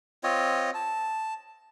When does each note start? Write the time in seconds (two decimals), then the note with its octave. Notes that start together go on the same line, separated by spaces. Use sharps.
0.23 C4 F4 C#5 D#5
0.74 A5